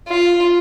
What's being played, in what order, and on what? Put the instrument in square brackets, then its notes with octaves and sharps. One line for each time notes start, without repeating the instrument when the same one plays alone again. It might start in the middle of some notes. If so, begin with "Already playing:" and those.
[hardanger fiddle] F4